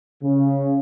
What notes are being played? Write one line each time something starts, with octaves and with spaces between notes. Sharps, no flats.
C#3